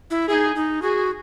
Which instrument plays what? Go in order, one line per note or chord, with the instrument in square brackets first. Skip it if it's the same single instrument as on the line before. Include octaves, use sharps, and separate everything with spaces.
[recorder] E4
[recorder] E4 [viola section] G#4
[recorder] D#4
D#4
[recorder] F#4 [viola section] G#4